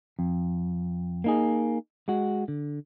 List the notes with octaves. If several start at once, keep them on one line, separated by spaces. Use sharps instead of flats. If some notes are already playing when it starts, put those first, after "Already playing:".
F2
A#3 D#4 G#4
G#3 F#4
D3